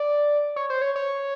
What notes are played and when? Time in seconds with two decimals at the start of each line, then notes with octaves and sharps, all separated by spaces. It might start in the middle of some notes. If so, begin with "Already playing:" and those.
Already playing: D5
0.56 C#5
0.70 C5
0.82 C#5
0.96 C#5